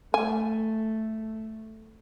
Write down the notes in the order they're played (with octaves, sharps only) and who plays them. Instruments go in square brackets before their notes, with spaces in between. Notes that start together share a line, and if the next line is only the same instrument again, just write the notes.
[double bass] A3 [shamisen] G#5